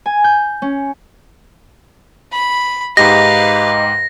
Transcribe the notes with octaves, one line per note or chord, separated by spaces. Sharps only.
G#5
G6
C#4
B5
G#2 G4 B4 D#5 F5 A#5 A#6